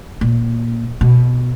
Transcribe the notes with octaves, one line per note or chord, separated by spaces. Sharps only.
A#2
B2